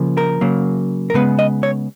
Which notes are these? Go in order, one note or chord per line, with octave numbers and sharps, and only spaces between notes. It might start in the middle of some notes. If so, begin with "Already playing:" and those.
Already playing: C#3 F3 A#3
A#4
C#3 F#3 A#3
A#4
C#3 G#3 B3 B4
D#5
C#5